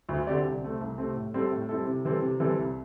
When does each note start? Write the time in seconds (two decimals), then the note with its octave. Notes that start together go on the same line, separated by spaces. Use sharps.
0.09 D2
0.27 D3 C4 G4 D5
0.45 C2
0.62 C3 A3 C4
0.81 C2
0.98 C3 A3 C4
1.16 A2
1.34 G3 C4 E4 A4
1.52 A2
1.69 G3 C4 E4 A4
1.86 C3
2.05 E3 G3 C4 A4
2.22 C3
2.40 E3 G3 C4 A4
2.59 C2